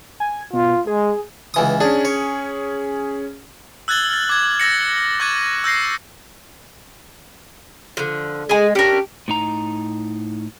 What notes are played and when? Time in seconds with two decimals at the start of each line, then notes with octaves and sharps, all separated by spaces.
0.20 G#5
0.53 B2 F4
0.87 G#3 G#4
1.54 C#2 E3 D#6
1.81 C#4 D4 G#4
2.05 C#5
3.88 E6 F#6 G#6 A6 F#7 G7
4.09 F6 A6
4.29 D6 G#6
4.60 E6 A6 A#6 C#7
5.20 C#6 D6 F#6 G#6 A6 D#7
5.64 E6 G6 A#6 C7
7.97 D3 F3
8.49 G#3 G#4 G#5
8.75 C#4 D4 G4 A#4
9.28 A2 D#4 A#5